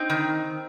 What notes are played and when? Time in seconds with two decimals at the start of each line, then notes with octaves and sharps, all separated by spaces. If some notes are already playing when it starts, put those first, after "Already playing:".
Already playing: C4 D#4
0.10 D#3